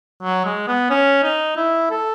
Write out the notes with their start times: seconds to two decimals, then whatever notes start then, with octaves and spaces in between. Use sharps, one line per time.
0.23 F#3
0.45 G#3
0.68 B3
0.90 C#4
1.23 D#4
1.56 E4
1.90 A4